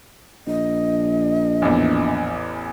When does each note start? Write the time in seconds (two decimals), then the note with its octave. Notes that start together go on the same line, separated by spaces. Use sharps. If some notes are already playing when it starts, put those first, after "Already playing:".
0.47 A#1 D#5
1.62 A1 E2